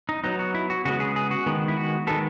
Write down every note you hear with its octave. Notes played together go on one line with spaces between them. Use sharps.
D#4
F#3 B3 D#4
F#4
E4
F#4
C#3 G#3 B3 F#4
G#4
G#4
F#4
D#3 G#3 B3
E4
F#4
D#3 G#3 B3 A4